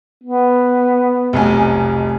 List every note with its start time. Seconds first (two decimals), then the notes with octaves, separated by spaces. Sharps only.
0.24 B3
1.33 F1 B1 G#5